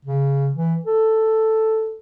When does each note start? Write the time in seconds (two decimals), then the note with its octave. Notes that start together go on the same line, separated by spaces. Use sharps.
0.05 C#3
0.54 E3
0.85 A4